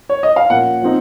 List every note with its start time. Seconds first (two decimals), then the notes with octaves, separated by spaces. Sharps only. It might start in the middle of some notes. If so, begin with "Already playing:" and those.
0.09 C#5
0.23 D#5
0.36 F5
0.50 A#2 F3 A#3 C#4 F#5
0.82 F3 C4 D#4